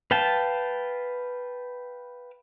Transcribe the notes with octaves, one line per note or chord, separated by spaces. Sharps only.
B4 F5 G5 A5